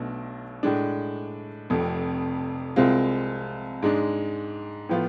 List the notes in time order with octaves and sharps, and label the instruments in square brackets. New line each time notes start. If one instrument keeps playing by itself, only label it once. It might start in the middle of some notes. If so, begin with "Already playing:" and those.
Already playing: [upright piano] B1 B2 A3 D4
A2 G#3 D4
F1 F2 C3
C2 C3 G#3 C4 F4
G#2 G#3 D4
A2 F3 B3 F4